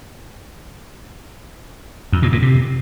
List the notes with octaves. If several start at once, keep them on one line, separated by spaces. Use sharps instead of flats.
F2
A#2
A2
C3